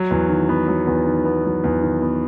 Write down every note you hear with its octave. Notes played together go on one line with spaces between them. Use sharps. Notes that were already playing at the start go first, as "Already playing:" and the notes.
Already playing: F#3
E2
D#3
B3
F#3
E2
D#3
B3
F#3
E2
D#3
B3